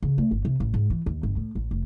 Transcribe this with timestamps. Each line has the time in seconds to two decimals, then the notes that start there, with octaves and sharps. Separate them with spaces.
0.03 C#3
0.18 A3
0.31 G1
0.45 C3
0.60 A1
0.74 G#2
0.90 E3
1.06 D#2
1.23 G1
1.36 A2
1.55 A1
1.71 F1